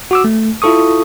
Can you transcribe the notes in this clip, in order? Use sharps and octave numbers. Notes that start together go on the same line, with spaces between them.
F#4 D6 E6
A3
E4 F4 A4 C#6 D#6